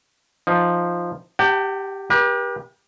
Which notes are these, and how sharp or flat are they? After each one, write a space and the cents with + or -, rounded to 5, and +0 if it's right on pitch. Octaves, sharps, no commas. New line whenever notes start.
F3 +0 D#4 +0
G4 +0 F#5 +45 A5 +40
G4 +10 B4 -45